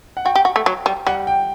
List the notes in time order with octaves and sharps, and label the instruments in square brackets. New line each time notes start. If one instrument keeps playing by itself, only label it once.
[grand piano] F#5
[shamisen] F#4 [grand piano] G5
[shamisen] G4
F#4
A3
F#3
G3
[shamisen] G3 [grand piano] F#5
[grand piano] G5